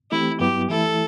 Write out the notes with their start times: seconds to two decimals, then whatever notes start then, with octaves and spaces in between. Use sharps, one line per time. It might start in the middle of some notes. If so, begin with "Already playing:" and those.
0.11 E3 A3 C4 E4 G4
0.40 G2 F#3 B3 E4 G4
0.69 E3 A3 E4 A4